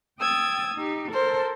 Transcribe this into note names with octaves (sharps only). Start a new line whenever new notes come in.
G5 D#6 E6 G#6 A6
D#4 G4
A4 A#4 C5 A5